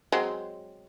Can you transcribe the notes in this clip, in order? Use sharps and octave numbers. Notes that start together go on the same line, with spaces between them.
F#3 G#3 C4